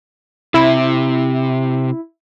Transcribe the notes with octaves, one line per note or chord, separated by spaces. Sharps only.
C3 E4